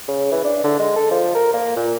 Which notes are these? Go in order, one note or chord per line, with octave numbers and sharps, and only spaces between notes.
C#3
E3
D4
D3
G#3
A4
F3
A#4
A#3
A#2